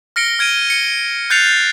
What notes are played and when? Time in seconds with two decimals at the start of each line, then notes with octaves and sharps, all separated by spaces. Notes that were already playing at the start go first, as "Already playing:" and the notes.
0.16 F6 A#6 C#7 D7 G7
0.39 F6 G#6 D7 D#7 G7
0.70 C#7
1.30 F#6 G6 A6 C7 C#7 F7